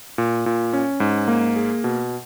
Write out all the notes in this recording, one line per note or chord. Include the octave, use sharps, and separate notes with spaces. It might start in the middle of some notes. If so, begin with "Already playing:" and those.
A#2
A#2
C#4
G#2
A#3
G#4
B2